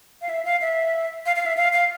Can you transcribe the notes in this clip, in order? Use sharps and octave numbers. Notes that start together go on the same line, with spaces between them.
F5
E5
F5
E5
F5
F5
E5
F5
F5